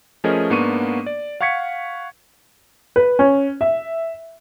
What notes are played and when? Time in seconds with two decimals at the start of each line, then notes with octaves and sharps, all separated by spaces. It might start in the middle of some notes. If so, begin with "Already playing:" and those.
0.24 F3 A3 C#4 G#4 A#4 D#5
0.50 G#2 A#3 B3 D4 C#6 D#7
1.06 D5
1.41 F5 F#5 C#6 G#6 B6 C#7
2.96 B4
3.19 C#4
3.61 E5